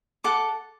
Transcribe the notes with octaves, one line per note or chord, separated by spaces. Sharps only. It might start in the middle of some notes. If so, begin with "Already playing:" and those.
A4 F#5 D6